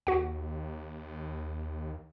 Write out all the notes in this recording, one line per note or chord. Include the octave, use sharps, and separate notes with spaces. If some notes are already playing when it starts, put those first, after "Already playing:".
D#2 F#4 F#5